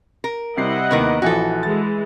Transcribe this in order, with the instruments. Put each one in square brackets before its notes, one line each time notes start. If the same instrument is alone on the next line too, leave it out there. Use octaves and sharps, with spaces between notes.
[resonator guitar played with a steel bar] A#4
[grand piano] C3 G3 C7 [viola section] E4 D#5 F#5
[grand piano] D#2 B3 [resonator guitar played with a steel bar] C3 D#3 A#4
[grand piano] A#1 E3 F3 [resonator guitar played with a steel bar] F#4 A4
[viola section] E3 G#3 [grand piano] A6